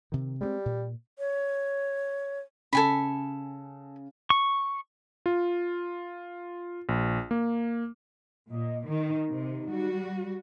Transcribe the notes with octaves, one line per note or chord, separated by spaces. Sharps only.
C3 D#3
G3 G#3 B3 C4
A#2
C#5
C#3 A4 G#5 B5
C#6
F4
A#1
A#3
A#2 D#5
D#3 D#4
C3
G3 F#4